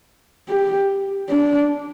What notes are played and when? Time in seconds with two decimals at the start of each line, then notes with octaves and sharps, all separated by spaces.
0.49 G4
1.29 D4